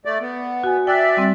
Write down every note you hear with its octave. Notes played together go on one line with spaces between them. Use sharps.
A3 D5
B3
F#4 G#5
D5 E5 G5 F#6
G3 C4